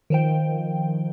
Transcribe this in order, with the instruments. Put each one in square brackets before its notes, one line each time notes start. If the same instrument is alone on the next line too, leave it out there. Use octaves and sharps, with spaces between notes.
[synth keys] D#3 F3 G5